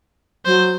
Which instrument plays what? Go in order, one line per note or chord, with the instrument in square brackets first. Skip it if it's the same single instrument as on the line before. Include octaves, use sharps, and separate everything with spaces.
[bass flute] F#3 [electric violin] C5